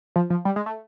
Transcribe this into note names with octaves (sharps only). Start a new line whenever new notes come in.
F3
F3
G3
G#3
A3